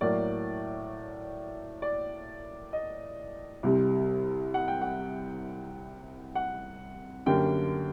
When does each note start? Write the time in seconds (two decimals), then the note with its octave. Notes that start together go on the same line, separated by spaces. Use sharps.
0.01 A2 F#3 A#3 D5
1.82 D5
2.73 D#5
3.63 C2 C3 G3
4.54 F#5
4.68 G5
4.81 F#5
6.35 F#5
7.26 F#2 D3 G3 A#3 G5